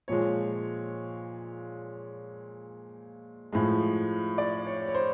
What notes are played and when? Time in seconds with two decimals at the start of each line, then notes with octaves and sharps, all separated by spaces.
0.08 A#2 F3 G#3 C#5
3.52 A2 F3 G#3
4.38 D5
4.66 C#5
4.88 C#5
4.94 C5